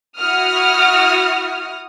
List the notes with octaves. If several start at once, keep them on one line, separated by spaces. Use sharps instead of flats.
E4 F#4 D#6 F6